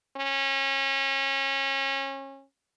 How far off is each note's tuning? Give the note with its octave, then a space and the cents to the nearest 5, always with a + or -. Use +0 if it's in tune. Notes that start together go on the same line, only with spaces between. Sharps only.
C#4 -25